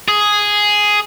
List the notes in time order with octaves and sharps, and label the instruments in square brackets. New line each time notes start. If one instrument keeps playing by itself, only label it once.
[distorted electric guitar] G#4